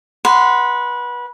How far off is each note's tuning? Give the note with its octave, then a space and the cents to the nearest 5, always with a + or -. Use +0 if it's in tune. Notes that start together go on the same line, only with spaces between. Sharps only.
B4 -25 F#5 +0 C6 -20